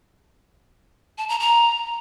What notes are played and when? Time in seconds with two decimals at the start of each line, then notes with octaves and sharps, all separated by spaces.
1.18 A5
1.29 A#5
1.40 A#5